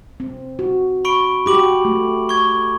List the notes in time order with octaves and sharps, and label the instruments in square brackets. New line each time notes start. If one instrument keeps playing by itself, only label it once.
[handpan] C4
F#4
[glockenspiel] B5 C#6 D7
[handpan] F#4 G4 [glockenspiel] B5 D6 F#7
[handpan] A3
[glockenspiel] C#6 G#6